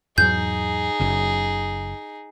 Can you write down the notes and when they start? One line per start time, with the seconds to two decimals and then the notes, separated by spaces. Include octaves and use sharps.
0.18 E2 G#2 F#3 D#4 G#4 G6
1.00 F#1 F#2 C#3